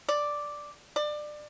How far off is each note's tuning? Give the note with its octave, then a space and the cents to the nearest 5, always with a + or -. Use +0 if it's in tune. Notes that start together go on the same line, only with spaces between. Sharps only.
D5 +0
D5 +25